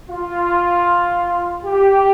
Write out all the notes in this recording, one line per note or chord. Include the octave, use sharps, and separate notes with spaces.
F4
G4